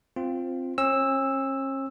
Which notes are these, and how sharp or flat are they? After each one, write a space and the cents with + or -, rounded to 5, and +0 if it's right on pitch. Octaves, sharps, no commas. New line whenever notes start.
C4 +0 F4 +0
C#4 -45 E6 +0